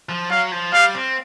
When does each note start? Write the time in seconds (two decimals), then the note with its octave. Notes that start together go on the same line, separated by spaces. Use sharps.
0.09 F3
0.31 F#3 F5
0.52 F3
0.72 G3 F5
0.94 C4